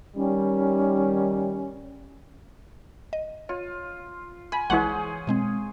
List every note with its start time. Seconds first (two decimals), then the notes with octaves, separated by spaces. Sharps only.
0.16 D#3 G3 C#4
3.13 D#5
3.49 F4 C#5
4.52 G#5 B5
4.70 A#1 E3 G#3 G#4 C5 C#5 F#5 B6
5.27 B2 G#3 C4